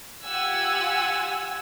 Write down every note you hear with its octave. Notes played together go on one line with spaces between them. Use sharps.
F4 G4 F#5 G#5 E6 G#6